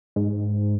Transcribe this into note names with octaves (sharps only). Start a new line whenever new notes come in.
G#2